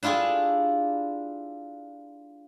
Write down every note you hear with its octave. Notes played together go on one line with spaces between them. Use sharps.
D4 E4 F4 G4 G#4